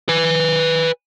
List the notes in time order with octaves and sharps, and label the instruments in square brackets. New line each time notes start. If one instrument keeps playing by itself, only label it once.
[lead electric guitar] B4 G#5